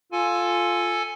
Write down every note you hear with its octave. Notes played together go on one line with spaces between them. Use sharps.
F4 A4 G#5